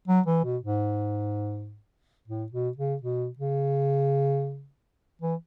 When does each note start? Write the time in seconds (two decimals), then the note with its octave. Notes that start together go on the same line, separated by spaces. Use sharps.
0.08 F#3
0.26 E3
0.44 B2
0.63 G#2
2.28 A2
2.52 B2
2.78 C#3
3.02 B2
3.39 C#3
5.22 E3